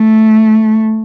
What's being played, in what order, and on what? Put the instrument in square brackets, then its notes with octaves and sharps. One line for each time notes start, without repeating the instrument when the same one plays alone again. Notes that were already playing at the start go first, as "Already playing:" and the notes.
Already playing: [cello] A3